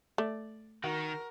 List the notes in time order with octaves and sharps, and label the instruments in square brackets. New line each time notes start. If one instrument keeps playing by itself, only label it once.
[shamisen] A3 [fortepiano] D5
[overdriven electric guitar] D#3 [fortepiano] F#4 [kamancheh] A#4